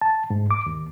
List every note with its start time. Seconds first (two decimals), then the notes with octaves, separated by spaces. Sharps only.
0.01 A5
0.30 G#2
0.51 D6
0.66 D#2